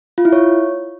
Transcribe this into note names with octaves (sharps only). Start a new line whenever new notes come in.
F4
E4
C#5